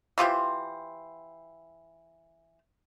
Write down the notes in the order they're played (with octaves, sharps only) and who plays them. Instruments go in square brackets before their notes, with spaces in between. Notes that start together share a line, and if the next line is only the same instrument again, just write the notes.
[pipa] E3 F4 G4 C5